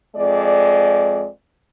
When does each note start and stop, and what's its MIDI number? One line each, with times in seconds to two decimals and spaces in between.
0.16 1.27 41
0.16 1.27 56
0.16 1.27 74